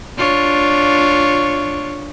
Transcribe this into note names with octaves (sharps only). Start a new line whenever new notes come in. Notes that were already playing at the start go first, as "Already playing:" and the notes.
D4 F4 C#5